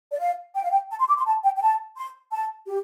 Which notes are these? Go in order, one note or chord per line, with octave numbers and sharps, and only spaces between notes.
D5
F5
G5
F5
G5
A5
C6
D6
C6
A5
G5
G5
A5
C6
A5
G4